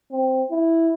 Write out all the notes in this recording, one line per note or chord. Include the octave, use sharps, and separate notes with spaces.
C4
E4